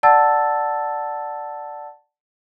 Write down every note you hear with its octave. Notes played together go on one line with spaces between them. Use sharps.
D5 F#5 A5 E6 A6